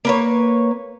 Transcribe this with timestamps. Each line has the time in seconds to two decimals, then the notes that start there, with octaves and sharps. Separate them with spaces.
0.05 A#3 B4 C#5